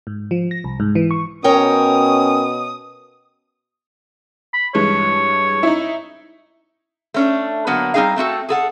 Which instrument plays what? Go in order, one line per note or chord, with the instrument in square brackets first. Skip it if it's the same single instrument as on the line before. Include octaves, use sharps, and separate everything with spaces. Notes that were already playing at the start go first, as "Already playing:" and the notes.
[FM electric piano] G#2
F3
A#6
C2
G#2
E3
C#6
[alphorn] B2 [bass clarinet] C#4 [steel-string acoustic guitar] A#4 C#5 G5 [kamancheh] D#6
[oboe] B5
[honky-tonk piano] G2 E3 G#3 [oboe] C#5
[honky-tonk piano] D#4 E4
[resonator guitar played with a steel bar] A3 C#4 D4
D3 F#3 A#3 B3
G3 C4 D#4 G#4 F5
A3 C4 F#4 A4
G#4 A4 F#5